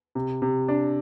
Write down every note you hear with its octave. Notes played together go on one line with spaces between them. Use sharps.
C3
C3
D4